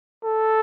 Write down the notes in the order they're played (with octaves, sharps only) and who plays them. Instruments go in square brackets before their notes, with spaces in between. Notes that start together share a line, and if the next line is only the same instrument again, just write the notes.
[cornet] A4